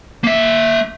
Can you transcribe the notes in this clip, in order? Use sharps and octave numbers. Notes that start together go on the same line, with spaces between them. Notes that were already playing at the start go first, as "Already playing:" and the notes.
A#3 E5